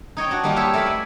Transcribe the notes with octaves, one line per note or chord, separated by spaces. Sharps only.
D#4 C#5 D#5 G5
D4 F#4
G3 A#3 D#4 F4 D#5
E4 G4 C#5 E5 A5
A3 A#4 D5 E5 B5
G#5